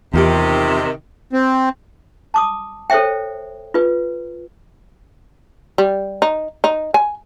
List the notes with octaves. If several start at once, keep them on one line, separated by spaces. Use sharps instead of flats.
E2 C3 D#3 D#4 F4 G4
C4
A5 D6 D#6
A4 C5 C#5 E5 G5
F4 B4
G3
D#4
D#4
G#5